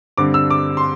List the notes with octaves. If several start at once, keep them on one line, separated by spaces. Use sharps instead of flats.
G2 D3 C4 D6
E6
D6
C6